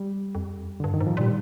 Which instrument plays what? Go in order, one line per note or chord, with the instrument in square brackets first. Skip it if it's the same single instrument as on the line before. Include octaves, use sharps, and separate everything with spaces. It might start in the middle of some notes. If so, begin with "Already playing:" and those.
Already playing: [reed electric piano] G3
[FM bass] F2
[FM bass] G2 [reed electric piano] D3
[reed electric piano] D#3
[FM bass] G#2
[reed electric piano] F3
[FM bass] A#2 [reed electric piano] G3